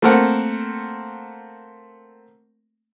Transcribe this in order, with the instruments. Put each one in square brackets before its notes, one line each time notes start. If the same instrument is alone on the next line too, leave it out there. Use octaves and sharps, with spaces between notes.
[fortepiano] A3 A#3 C4 A4 A#4 F#5